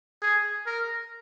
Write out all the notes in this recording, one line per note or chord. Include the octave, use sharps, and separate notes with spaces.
G#4
A#4